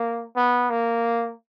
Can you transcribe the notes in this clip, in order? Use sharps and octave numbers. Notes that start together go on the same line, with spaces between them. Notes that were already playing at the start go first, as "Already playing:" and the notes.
Already playing: A#3
B3
A#3